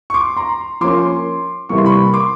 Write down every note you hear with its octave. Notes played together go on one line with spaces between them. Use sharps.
C#6
C6 D6
A#5 C6
F3 A#3 C#4 C6 D6
C3 E3 G3 A#3 C#6
C6
B5 C#6
C6 D6